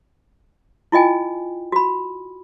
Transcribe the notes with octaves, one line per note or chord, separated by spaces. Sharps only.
E4 F4 D#5 G5 G#5
F#4 B5